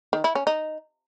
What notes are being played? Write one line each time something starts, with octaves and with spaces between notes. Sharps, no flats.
D#3
E4
C#4
D#4